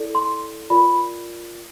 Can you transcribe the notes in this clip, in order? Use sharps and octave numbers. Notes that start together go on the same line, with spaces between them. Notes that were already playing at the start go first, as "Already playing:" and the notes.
Already playing: E4 A4 D5
C6
F4 A#4 D5 B5